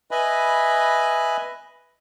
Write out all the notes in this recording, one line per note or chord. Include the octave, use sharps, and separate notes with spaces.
B4 D#5 E5 G#5 B5